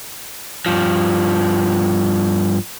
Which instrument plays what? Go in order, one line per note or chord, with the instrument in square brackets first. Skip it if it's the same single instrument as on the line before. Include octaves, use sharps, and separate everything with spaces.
[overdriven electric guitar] G2 F3